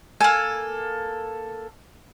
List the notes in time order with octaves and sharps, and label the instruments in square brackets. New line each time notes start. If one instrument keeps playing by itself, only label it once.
[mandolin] A#3 A4 [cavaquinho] G#5